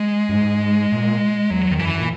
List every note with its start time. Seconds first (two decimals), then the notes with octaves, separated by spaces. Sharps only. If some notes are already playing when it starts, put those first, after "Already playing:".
Already playing: G#3
0.29 F#2
0.34 G#2
0.92 A#2
1.50 E2 F#3
1.71 E2 D#3
1.79 F#2 E3
2.01 A#2